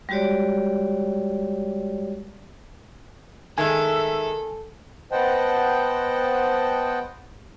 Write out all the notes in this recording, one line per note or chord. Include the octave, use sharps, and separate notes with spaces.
G3 G#3 F#4 G4 C#5 D5
D#3 G#3 A4 E5 G#5
B3 C5 D#5 F#5 G5 A5